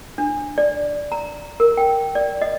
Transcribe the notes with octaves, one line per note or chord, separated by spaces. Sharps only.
D4
D5
A#5
A#4
G5
D5
D#5